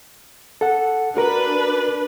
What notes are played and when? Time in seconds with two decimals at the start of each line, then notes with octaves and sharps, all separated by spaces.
0.61 A4 F#5
1.17 D4 F#4 A#4 B4